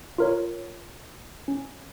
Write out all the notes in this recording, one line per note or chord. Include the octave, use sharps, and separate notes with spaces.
F4 A#4 C#5
C#4